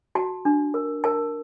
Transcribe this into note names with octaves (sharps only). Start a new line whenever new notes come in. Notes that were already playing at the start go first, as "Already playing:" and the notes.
F#4 A5
D4
A#4
A#4 A5